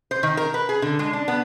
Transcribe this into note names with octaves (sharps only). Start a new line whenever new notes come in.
C5
D#3
A#4
B4
G#4
D3
G#3
D4
B3